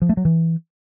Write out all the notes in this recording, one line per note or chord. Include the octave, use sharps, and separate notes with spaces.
F3
A3
F#3
E3